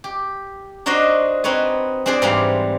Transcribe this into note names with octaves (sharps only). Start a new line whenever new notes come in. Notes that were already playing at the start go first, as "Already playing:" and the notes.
G4
D4 D#4 F#4 C5 D#5
C4 D#4 B4 C#5 G#5
C4 D4 G4 G#4 C5 D5
G#2 E3 G3 F5